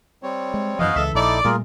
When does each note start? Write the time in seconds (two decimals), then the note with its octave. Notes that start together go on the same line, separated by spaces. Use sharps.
0.23 G3 C4 C#5
0.54 G#3
0.79 F#2 B2 E3 F3 D#5 F5
0.95 C#2 C#3 E3 A4 E5
1.15 A#1 D#4 E4 A4 D5
1.44 A#2 G3 A3 F4 G#4 A#4